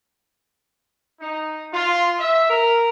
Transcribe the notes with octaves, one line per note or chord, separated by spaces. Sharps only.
D#4
F4
E5
A#4